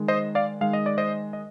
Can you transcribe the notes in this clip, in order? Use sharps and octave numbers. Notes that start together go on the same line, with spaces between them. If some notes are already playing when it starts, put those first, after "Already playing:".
Already playing: D#3 G#3
C5 D#5
D5 F5
D#3 G#3 F5
D#5
D5
C5 D#5
D#5